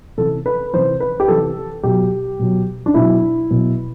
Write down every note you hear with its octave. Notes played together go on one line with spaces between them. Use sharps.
C3 E3 A4
B4
C3 E3 C5
B4
G4
C3 E3 A4
B2 F#3 G4
B2 F#3
D4
B2 F#3 E4
B2 F#3